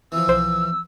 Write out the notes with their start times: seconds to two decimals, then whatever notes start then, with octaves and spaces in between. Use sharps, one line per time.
0.12 E3 F3 E6
0.28 B1 C5